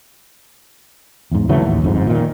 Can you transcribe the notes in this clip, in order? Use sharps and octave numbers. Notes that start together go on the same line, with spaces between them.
E2 G#2
C#3 E3 F#3 A3
A1 D#2
G1 F2 G#2
A#2 D#3